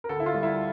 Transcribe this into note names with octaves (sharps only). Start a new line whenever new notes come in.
A#4
D2 A4
E4
F4
G3
E4